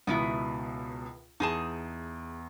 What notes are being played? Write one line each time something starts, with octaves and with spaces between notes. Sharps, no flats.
C#2 B2 D#3 B3 E4
E2 D#4 G#4 A5